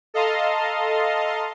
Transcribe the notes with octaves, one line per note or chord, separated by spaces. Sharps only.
A4 D#5 F5 A5 A#5 C6